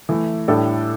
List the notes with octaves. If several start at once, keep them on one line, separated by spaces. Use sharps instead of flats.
E3 A3 E4
A2 G3 D4 A4